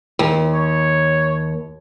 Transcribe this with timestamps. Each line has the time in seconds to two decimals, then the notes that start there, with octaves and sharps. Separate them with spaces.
0.19 D#2
0.54 C#5